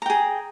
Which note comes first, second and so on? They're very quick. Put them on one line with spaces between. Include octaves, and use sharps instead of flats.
A#5 G5 G#4